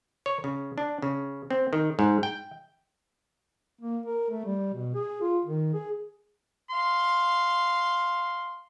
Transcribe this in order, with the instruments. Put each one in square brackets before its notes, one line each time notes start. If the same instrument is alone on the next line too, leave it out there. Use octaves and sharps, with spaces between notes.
[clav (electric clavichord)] C#5
C#3
D4
C#3
C4
D#3
G#2
G5
[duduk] A#3
A#4
A3
G3
B2
G#4
F4
D#3
G#4
[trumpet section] F5 C6